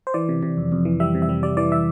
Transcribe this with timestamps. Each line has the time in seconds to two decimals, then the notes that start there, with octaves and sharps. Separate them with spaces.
0.07 C5
0.14 E3 D5
0.29 C3
0.43 C3
0.57 F2
0.72 F2
0.85 E3
1.00 G3 E5
1.15 C3
1.22 E5
1.29 G3
1.43 G3 D5
1.57 E3 D5
1.72 E5